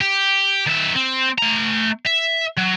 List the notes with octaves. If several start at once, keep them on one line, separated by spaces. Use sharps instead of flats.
G4
D#3 E5
C4
A3 A#5
E5
F#3